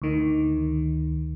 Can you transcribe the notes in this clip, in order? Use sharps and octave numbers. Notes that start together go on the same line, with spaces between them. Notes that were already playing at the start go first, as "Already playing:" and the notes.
D2 D#3